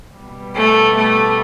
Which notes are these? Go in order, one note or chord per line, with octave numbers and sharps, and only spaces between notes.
B2 G3
A3
A3